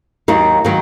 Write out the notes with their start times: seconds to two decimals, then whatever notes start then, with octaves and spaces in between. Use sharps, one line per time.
0.28 D#2 D#3 F#3 A#3
0.65 D#3 F#3 A#3